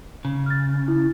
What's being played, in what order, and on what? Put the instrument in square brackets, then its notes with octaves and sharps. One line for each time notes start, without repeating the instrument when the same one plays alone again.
[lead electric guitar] C#3
[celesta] F6 A6
E4